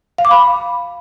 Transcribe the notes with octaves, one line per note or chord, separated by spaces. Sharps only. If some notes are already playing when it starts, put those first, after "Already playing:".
F5
D6
B5